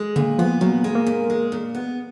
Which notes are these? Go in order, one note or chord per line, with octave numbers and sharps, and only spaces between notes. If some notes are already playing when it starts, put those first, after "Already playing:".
Already playing: G#3
A#2 D3
F3 B3
A#2 F#3
G#3
A#3
A#2
G#3
A#2
B3